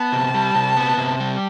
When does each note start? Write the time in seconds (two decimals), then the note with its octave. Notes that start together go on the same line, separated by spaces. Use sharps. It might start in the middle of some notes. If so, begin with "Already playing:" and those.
Already playing: B3 A5
0.12 C3
0.34 G3
0.55 C3
0.77 B3
0.97 C3
1.20 G3